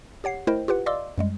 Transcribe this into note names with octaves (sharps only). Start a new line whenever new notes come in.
G4 C#5 F#5 C7
A3 E4 A#4 C5 D#5 G5
F4 G4 B4 F#5
D5 D#5 F5 C6 D6 E6
F#2 G3 G#3